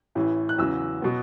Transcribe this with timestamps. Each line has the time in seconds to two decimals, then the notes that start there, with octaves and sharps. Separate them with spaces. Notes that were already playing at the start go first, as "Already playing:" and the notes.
0.15 A1 A2 E3
0.49 F#6
0.59 E2 C#3 F#3 E6
1.02 B2 F#3 B3